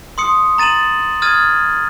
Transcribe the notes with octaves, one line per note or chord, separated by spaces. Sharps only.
C6 D#6 C#7
A#5 A6 D#7 E7 F#7
D#6 F6 G#6 A6 D#7